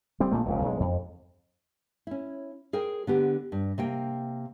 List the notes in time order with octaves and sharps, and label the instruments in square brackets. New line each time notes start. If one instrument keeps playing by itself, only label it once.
[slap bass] G3 C4
A#1 A#2 A3 A#3
F1 C#2 C#3
B1 G#3
F2
[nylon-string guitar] C#4 E4
G#4 A#4 C5 G5
D3 B3 G4
G2
C3 A#3 G5